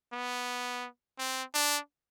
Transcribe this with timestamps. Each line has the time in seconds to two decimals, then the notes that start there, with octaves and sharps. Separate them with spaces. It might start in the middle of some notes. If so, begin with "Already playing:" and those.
0.13 B3
1.19 C4
1.54 D4